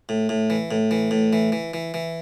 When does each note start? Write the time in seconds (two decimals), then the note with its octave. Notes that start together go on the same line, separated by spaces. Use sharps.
0.09 A2
0.29 A2
0.50 E3
0.71 A2
0.91 E3
1.11 A2
1.33 E3
1.52 E3
1.74 E3
1.94 E3